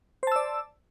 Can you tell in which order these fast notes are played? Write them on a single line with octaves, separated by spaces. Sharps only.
C5 A5 E6 D5